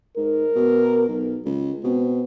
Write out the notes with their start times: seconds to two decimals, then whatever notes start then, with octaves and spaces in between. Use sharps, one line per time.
0.17 G#2 A#4
0.56 B2
1.08 B1
1.45 C#2
1.84 B2 C4